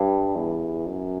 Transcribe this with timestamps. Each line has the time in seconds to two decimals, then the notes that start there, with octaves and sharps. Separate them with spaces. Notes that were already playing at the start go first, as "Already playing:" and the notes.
Already playing: G2
0.36 E2
0.86 F#2